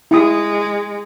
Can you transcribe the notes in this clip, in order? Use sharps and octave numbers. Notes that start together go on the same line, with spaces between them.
G#3 E4 D#6